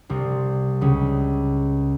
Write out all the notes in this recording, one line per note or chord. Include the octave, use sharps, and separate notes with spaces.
C2 C3
C#2 C#3